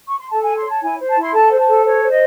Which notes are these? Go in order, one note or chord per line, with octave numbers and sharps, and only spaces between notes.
C#6
C6
A4 A5
G#5
C#5
C6
C#5 A5
E4 G#5
C5
A5
E4 C6
A4 A5
C5
A5
A4
C5 C#5
C5
D#5